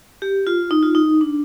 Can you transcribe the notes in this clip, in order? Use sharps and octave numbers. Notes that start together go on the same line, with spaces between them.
G4
F4
D#4
F4
D#4
D4